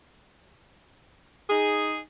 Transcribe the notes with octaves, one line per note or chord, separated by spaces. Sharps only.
D#4 G#4